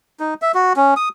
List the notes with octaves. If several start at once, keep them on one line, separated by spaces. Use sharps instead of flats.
D#4
E5
F#4
C#4
D#6